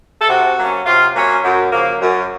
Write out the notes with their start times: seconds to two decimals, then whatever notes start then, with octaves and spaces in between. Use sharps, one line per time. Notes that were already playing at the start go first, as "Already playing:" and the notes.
0.21 A4
0.28 C3 F#4
0.58 F#3 A#3 C#4
0.86 C3 F4
1.15 F#3 A#3 C#4
1.44 F#2
1.72 C#3 F3 A#3
2.01 F#2